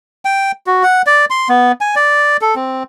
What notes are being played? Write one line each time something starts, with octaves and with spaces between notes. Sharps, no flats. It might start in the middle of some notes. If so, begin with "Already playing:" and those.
G5
F#4
F#5
D5
C6
B3
G#5
D5
A4
C4